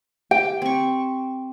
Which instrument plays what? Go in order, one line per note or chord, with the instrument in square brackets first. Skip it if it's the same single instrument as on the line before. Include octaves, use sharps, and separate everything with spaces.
[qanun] G4 [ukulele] G5
[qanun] C4 C#6